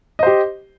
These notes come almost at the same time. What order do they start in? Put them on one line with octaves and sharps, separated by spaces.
D#5 C5 G4